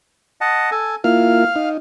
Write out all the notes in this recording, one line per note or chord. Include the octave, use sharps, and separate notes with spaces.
D#5 F#5 A5
A4 G#5
A#3 E4 F4 F5 F6
D#4